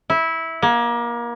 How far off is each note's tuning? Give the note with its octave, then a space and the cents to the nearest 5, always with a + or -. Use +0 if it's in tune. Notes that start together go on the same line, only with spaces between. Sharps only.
E4 -15
A#3 +30